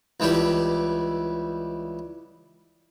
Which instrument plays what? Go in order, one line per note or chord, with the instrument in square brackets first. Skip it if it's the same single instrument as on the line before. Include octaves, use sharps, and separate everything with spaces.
[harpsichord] C#2 E3 G3 G4